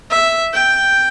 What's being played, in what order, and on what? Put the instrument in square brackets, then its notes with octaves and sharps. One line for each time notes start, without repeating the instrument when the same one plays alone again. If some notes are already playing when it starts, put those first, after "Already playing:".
[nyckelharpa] E5
G5